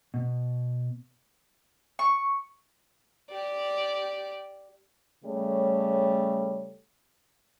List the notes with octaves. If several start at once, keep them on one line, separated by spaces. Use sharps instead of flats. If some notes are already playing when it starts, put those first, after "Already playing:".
B2
C#6
G4 D5
C#3 G3 A3 A4 C#5